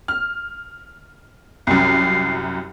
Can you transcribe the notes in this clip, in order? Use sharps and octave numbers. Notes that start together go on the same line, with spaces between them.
F6
C2 F#2 C7